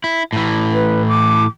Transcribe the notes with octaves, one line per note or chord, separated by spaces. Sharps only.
E4
A2 E3
B4
D6